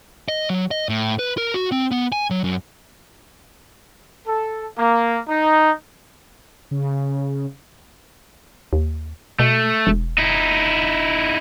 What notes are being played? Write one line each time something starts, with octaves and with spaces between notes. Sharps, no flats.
D#5
F#3
D#5
A2
B4
A#4
F#4
C4
B3
G#5
F#3
F#2
A4
A#3
D#4
C#3
D#2
B2 A3
E1
D#4 E4